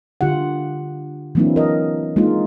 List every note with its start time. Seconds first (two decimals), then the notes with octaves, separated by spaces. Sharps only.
0.21 D3 F4 G4 F#5
1.35 E3 F#3 A#3 C4 D4 E4
1.56 A#4 D#5
2.16 G#3 A#3 D#4 F4